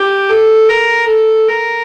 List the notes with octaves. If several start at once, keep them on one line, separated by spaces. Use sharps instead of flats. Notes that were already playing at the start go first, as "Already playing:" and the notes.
Already playing: G4
A4
A#4
A4
A#4